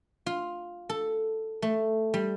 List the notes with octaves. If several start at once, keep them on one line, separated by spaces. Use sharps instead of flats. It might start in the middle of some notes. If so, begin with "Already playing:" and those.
F4
A4
A3
G3